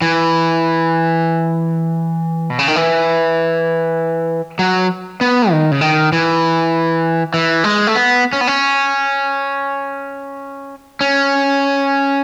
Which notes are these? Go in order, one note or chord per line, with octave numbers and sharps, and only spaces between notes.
E3
B2
C#3
D#3
E3
F#3
B3
D#3
C#3
D#3
E3
E3
G#3
A3
B3
C#4
B3
C#4
C#4